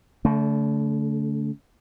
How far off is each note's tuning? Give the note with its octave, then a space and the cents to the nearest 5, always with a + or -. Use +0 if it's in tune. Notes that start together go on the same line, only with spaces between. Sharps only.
D3 -40 A3 +0